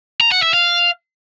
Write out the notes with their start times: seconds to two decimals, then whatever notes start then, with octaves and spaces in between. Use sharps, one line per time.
0.21 A#5
0.32 F#5
0.43 E5
0.54 F5